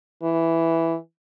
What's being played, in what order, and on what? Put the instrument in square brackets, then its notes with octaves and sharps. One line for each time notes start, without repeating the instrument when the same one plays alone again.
[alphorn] E3